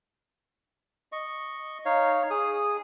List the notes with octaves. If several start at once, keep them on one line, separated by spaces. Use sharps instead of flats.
D#5 C#6
D#4 C#5 F5
G#4 D#6